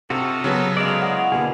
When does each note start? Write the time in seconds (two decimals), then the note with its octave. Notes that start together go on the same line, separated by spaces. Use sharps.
0.10 C3 D4 F4 F#4 A4 D#5
0.44 C#3 F#3 B3 A#4 C5 A5
0.77 G#3 D5 F5 E6
0.88 D#4 C5
1.01 E4 F#4
1.32 B2 D3 A#3 G#4